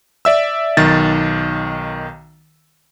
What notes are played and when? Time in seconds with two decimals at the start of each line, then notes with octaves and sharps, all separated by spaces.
0.25 D5 E5 E6
0.77 B1 D#3 A6